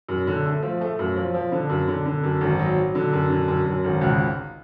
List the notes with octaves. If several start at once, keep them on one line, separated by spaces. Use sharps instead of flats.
F#2
D3
A3
F3
A3
F#2
F3
F3
D3
F#2
D3
D3
F#2
G#1
F#3
F#3
D3
F#2
D3
F#2
F#2
G#1
C#2